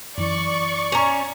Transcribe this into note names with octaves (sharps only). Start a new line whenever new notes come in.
F#2 E3 D5 C#6
C#4 A#5